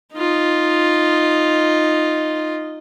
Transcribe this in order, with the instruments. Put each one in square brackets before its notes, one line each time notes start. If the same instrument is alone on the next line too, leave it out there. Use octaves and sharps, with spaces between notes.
[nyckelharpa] D#4 F4